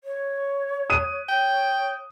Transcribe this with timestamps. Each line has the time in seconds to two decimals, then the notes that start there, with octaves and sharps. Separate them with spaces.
0.04 C#5
0.90 D#6 D#7
1.29 C#5 G5